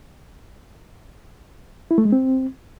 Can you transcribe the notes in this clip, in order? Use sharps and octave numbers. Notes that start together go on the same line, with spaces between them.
E4
A3
G#3
C4